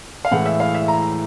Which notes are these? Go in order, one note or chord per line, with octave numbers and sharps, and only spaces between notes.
F5
A2 E3 G#3 F#5
E5
F5
E5
A#5